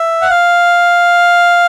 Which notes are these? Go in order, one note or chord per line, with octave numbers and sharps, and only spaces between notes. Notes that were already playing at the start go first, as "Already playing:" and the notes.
Already playing: E5
F#5
F5